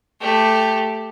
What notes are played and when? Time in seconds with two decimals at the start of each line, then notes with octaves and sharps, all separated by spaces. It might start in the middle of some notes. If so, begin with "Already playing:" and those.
0.20 A3 G4